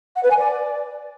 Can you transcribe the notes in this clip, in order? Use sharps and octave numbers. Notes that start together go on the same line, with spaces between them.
F#5
B4
G#5
D5